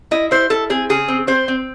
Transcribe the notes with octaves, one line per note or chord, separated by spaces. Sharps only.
E4 D#5
E4 C5
E4 A4
C4 G#4
C#3 G#4
C4
C4 C5
C4